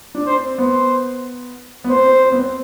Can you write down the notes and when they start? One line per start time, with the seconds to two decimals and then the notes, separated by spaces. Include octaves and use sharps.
0.15 D4
0.26 C5
0.37 C4
0.58 B3 C5
1.84 B3
1.90 C4 C5
2.06 C4
2.23 C4
2.32 B3
2.40 C4